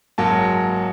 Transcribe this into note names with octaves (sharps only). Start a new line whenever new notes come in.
F#1 G#2 F#3 A#3 A5